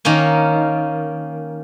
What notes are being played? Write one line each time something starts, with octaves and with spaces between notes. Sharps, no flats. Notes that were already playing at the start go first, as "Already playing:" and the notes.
D#3 A#3 C#4